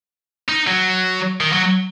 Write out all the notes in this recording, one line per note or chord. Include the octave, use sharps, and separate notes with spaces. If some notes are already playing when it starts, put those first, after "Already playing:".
D#4
F#3
D#3
F#3